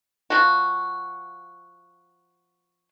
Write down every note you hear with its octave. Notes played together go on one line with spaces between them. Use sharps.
F3 F#4